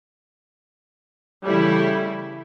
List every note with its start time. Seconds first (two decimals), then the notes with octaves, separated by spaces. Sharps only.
1.46 C#3 E3 G3 A3 E4 G4